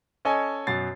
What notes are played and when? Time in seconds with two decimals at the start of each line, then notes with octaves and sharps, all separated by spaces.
0.25 C#4 A4 C#5 D#5 G#5
0.67 F#2 B2 F#3 A6 C7